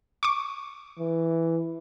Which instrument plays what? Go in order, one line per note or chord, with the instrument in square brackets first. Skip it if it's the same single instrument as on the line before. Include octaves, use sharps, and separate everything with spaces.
[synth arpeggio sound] C#6 D6
[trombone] E3